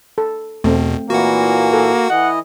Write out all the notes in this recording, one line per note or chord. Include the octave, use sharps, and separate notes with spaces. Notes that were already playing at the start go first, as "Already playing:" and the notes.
A4
E2 B2 A3 C4
A#2 E3 A#3 F#4 F#5
A4
E3 D#5 F#5